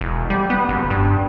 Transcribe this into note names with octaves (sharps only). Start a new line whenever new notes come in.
E1
G3
B3
F#1
G2